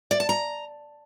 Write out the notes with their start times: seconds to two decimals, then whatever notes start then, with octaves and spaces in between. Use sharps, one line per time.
0.11 D5
0.20 A5
0.29 A#5